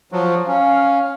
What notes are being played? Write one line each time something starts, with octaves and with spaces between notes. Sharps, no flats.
F3 F#3
C#4 F5